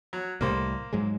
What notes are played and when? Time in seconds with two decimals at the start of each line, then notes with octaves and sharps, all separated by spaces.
0.13 F#3
0.41 C2 A2 G3 A#3 C5
0.93 G#2 F#3 G#3